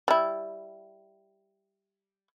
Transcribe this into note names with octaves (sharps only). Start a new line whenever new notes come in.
G3 E4